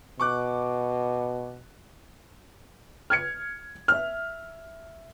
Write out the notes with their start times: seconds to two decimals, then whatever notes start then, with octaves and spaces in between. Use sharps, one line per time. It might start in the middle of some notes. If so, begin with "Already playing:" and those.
0.20 B2 C#6 D6 F#6
3.10 F6 G#6 C#7
3.88 E5 F6